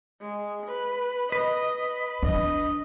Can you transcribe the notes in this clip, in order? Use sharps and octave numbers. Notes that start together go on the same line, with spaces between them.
G#3
B4
B4 D#5
D4 D#5